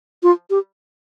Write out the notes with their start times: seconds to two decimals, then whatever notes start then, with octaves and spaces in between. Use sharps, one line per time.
0.23 F4
0.50 G4